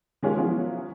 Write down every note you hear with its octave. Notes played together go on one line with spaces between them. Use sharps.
D#3 G#3 C#4 F4 G4 A#4
F3 F#3 B3 C#4 E4 F4